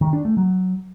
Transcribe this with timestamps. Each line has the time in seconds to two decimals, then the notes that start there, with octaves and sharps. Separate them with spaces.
0.01 D#3
0.13 D4
0.25 A3
0.37 F#3